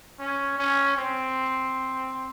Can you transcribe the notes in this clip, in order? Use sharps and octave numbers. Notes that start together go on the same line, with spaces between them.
C#4
C#4
C4